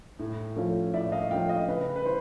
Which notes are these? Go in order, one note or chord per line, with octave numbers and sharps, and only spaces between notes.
A2
F3 A3 C#4
A2 D5 E5
D#5 F5
F3 A3 C#4 F5 G5
D#5 F5
C#3 B4
B4
E3 C5